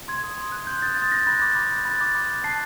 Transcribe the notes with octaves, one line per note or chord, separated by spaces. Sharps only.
C6 G#6
D#6
C6
F#6
C6 G6
D#6 A6
C6 A6
F#6 A#6
B5 A6
D6
B5
F#6
B5 A6
D6
B5
F#6
A5 C7